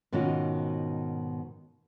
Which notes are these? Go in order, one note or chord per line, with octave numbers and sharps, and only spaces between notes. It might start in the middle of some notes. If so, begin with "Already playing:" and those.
G#2 B2 D#3 C#4 F4 F#4